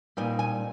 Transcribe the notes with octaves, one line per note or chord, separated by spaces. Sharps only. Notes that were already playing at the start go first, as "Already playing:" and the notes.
A#2 G3 C4 D#4 G#5
G#5